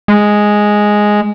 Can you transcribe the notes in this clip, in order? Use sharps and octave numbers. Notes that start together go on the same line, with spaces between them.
G#3